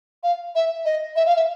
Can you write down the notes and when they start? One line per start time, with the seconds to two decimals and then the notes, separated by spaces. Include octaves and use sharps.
0.23 F5
0.55 E5
0.85 D#5
1.16 E5
1.26 F5
1.36 E5